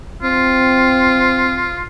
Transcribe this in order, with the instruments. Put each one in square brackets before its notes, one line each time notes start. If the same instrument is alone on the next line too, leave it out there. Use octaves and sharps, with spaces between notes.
[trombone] C4 [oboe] F4